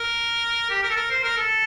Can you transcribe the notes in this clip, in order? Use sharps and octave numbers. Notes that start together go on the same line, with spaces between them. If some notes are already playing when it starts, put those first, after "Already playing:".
Already playing: A#4
G4
A#4
A4
A#4
C5
A#4
A4